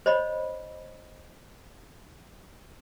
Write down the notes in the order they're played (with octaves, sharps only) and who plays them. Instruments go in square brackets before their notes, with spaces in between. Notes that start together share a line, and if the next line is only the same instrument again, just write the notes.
[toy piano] C5 C#5 D#5 B5